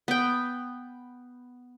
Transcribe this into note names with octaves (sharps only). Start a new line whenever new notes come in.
B3 G5